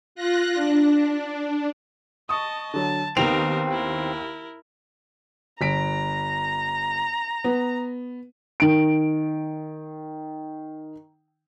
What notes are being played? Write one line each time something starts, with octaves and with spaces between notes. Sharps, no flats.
F4 F#6 A#6
D4
D#5 A5 C#6 D#6
D3 F#3 A5
D#2 D#3 B3 C4 D#4 A#4 G5 F7
E4 A#4
G1 A#5 B6 D7
B3
D#3 D7